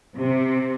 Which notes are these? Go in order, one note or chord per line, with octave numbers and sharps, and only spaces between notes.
C3